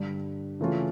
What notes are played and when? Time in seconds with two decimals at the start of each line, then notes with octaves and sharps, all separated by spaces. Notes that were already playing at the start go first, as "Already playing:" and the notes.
Already playing: G2 D3 G3 D4
0.60 C#3 E3 A3 C#4 F4